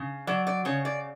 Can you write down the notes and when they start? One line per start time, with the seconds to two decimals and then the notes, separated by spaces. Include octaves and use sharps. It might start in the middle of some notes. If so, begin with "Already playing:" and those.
Already playing: C#3
0.27 F#3 D5
0.47 D5
0.65 C#3 C#5
0.85 D5